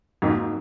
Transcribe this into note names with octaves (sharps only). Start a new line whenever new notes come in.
F2 G#2 F#3 A#3 D#4